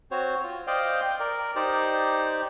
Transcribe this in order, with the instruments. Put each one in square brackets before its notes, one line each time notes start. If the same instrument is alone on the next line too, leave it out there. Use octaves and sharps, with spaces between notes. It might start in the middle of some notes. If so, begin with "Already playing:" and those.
[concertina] C4 F#4 C5 C#5
F4
C5 D5 D#5 F5 G5
G5
A#4 D5
D#4 G4 C5 D5